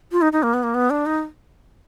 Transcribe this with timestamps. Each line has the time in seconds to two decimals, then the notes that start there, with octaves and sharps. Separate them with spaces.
0.12 F4
0.22 D#4
0.32 D#4
0.43 A#3
0.54 B3
0.63 A#3
0.74 B3
0.90 D4
1.06 D#4